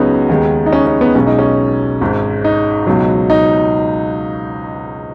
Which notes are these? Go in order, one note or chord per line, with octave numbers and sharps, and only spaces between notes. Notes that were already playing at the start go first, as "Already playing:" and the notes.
Already playing: C#2 C#3 F#3 B3 C#4 D#4 F#4
D#2 D#3 G#3
D#4
C#4
C#4
B3
B1 B2 G#3 C#4
D#4
C#4
G#1 G#2 G#3
D#4
C#2 B2 F#3
D#4